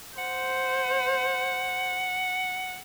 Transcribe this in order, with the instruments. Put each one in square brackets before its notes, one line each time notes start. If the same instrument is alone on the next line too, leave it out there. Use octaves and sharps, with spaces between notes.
[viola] C5 [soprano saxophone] F#5